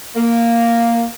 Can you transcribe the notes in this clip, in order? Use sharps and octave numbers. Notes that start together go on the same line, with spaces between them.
A#3